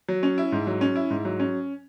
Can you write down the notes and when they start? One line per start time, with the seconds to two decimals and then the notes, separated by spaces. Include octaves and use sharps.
0.08 F#3
0.23 C#4
0.38 E4
0.52 G#2
0.67 F#3
0.81 C#4
0.96 E4
1.10 G#2
1.25 F#3
1.39 C#4